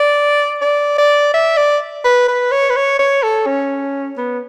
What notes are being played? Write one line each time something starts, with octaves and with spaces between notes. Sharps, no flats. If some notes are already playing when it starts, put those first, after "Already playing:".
Already playing: D5
D5
D5
E5
D5
B4
B4
C#5
B4
C#5
C#5
A4
C#4
B3